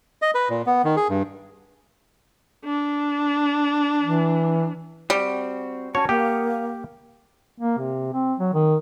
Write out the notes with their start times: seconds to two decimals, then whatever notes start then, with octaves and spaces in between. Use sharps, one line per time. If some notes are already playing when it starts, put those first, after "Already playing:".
0.22 D#5
0.35 B4
0.50 A#2
0.66 B3
0.84 D#3
0.96 G#4
1.09 G2
2.65 D4
4.02 E3
5.10 G3 C4 F#4
5.95 C#4 F#4 C#5 A5
6.09 A#3 G4 F5 F#5 D#6
7.60 A#3
7.78 C3
8.13 C4
8.39 F#3
8.54 D#3